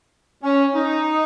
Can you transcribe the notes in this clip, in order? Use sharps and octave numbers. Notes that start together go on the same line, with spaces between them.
C#4
D#4